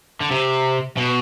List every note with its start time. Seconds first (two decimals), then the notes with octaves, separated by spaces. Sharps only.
0.20 D3
0.30 C3
0.97 B2